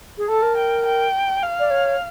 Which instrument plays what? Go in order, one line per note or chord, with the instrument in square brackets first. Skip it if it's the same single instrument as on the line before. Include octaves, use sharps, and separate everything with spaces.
[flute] G#4
[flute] A4 [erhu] A5
[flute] A#4
[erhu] G5
G5
F5
[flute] D5
C#5